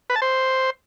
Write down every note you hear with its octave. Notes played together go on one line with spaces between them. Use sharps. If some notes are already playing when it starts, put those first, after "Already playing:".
B4
A5
C5